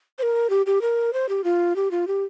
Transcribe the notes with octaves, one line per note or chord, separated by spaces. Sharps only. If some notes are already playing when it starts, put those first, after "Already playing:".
C5
A#4
G4
G4
A#4
C5
G4
F4
G4
F4
G4